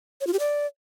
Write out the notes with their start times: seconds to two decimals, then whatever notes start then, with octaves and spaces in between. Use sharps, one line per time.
0.21 C#5
0.27 F4
0.33 G4
0.39 D5